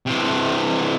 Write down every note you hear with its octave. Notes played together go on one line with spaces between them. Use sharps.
C3 E3